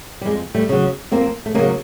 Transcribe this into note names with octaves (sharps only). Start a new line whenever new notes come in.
G3
F2 G#3
G3 A3
C#3 F#3
F2 A#3 C4
A3
C#3 F#3 G#3 A#3